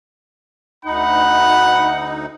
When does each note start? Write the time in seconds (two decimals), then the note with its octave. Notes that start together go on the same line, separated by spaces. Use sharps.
0.85 D2 D#4 F#5 B5